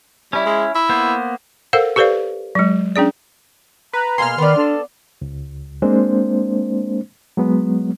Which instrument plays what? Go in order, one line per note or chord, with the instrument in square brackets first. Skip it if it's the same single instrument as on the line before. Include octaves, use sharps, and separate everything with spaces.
[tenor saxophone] G3 [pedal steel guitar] C#4 E4
[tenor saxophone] G#3
E4
[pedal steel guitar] A#3 B3 C5
[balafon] A4 A#4 C5 F5 F#5
G4 A4 B4 C5 D5 F5
F#3 G#3
C#4 D4 G#4 D5
[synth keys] B4 [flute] A#5
[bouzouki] B2 A#3 G#4 [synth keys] C6 F6
[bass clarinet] D#3 [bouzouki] B3 D5 [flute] B5
[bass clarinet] D4 [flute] A4
[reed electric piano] C#2
G#3 A#3 C4 D4 C5
F#3 G#3 B3